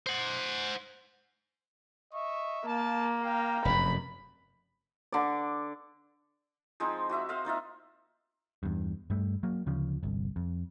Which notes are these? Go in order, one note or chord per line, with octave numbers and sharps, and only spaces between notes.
C5 F#5
D#5 E5 C#6
A#3 F5 A5
F5 G5 A#5
F1 F#2 B5
D3 D5
F3 G#3 C4 D#4
F#4 D#5 E5 F#5
C5 D#5 F5 F#5
A#3 D#4 F4 E5
E2 G2
G2 G3 A3
F#3 A#3
D2 C#3 F3
G1 C2
F2